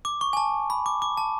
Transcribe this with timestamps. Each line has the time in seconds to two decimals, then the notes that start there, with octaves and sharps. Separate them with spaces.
0.05 D6
0.21 C#6
0.33 G#5
0.37 A5
0.70 B5
0.86 D6
1.02 D6
1.17 A5